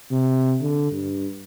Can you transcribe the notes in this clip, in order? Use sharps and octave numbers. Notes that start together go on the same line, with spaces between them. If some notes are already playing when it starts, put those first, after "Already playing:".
C3
D3
G2